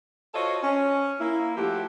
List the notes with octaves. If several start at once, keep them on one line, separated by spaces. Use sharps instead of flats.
F4 F#4 A4 C5 C#5 D#5
C#4
A#3 E4
F3 A3 E4 F#4 G4